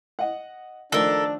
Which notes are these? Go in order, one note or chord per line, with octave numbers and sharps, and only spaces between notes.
D#5 F#5
D#3 F3 A3 D4 A4 A#4